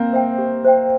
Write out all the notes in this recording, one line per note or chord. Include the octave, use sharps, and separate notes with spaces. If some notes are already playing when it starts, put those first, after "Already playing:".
Already playing: A#3 C4
C5 E5 G5
G4
C5 E5 G5